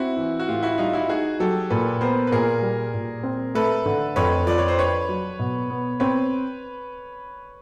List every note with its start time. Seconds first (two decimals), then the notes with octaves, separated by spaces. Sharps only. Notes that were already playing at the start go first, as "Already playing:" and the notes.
Already playing: C4 E4 F#4
0.17 E3
0.39 F#4
0.48 A2 F4 G4
0.63 E4 F#4
0.78 G3 D#4 F4
0.93 E4 F#4
1.09 D#4 F#4 G#4
1.40 F#3 G4 A4
1.70 A#2 A4 B4
2.01 B3 A#4 C5
2.27 B4
2.32 A#2 G#4 A#4
2.62 G3
2.94 A#2
3.23 C4
3.55 A3 A4 B4
3.86 D3
4.16 F2 B4 C#5
4.46 F3 D5
4.58 C#5
4.68 C5
4.78 D4 B4 C#5
5.09 F#3
5.39 B2
5.70 B3
6.00 C4 B4 C#5